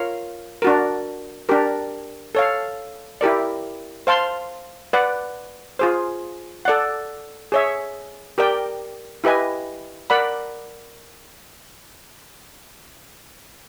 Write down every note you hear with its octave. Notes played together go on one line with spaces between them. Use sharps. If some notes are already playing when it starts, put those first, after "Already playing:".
Already playing: F4 A#4 C#5 F5
D4 F#4 A#4
D4 G4 A#4
A4 C#5 F5
E4 G4 A#4 D5
C5 F5 A5 C6
B4 D5 F#5
F4 G#4 C5
A4 D5 F#5
G#4 C#5 E5
G4 A#4 D5 G5
E4 G4 B4 D#5 G#5
A#4 D5 F#5 B5